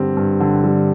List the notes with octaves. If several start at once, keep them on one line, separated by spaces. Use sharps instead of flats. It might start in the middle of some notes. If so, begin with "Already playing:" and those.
Already playing: G2 D3 G3 C4
G2
D3
G3